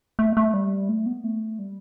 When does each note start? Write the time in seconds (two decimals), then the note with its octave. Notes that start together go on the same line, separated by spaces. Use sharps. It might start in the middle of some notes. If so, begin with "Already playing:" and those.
0.19 A3
0.37 A3
0.54 G3
0.89 A3
1.06 B3
1.24 A3
1.59 G3